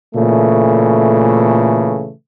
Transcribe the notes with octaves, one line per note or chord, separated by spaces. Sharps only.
A#2 C#3 E3 A3